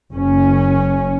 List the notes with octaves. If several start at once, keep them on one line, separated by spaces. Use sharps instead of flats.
F#1 C#4